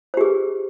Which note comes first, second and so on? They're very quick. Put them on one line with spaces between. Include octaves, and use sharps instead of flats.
C5 G4 G#4 B4